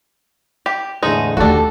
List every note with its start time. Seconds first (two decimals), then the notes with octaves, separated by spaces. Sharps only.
0.66 G4
1.03 E2 A2 D3 G#3 D#4
1.37 D#2 D3 A3 D4 F#4 G4 A4